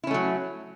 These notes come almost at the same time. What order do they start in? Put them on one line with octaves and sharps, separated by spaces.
E4 C#4 A3 F#3